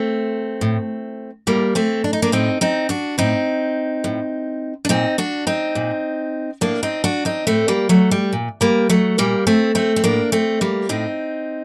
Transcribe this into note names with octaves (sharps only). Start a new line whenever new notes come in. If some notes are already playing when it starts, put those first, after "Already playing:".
Already playing: A3 C4
A2
A2 G3 A#3
A3 C4
D4
D#4
A#3 D4
A2 C4 D#4
C4 D#4
D4 F#4
A2 C4 D#4
A2
D4
A#2 C4 D#4
D4 F#4
C4 D#4
A#2
A2 A#3 D4
C4 D#4
D4 F#4
C4 D#4
A2 A3 C4
G3 A#3
F#3 A3
G3
A#2
G3 A#3
F#3 A3
A#2 G3 A#3
A3 C4
A3 C4
C4
A2 A#3 D4
A3 C4
G3 A#3
A2 C4 D#4